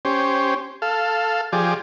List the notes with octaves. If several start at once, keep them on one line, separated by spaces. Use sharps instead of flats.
C#4 G4 C5
A4 F5
F3 G4 G#4 D5